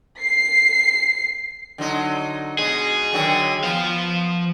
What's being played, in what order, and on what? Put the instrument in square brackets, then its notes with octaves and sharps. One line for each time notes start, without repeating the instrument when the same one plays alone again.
[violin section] C7
[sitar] D3 F#3 D#4
[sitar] B2 G#3 [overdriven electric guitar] G#4
[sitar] D3 D#3 F#3
[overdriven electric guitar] F3 F5 [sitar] B3